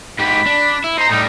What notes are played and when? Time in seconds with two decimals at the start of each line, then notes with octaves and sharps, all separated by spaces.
0.19 G#2 G4 B5
0.46 D4
0.84 E4
0.98 D#4 C5 A#5
1.09 A2 G3 D#4